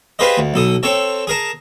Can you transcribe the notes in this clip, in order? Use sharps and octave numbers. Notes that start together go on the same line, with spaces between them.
F4 G4 G#4 B4 C5 D#5
D2
B1 A4 D#6
C4 A4 C#5 A5
G#4 A#4 A5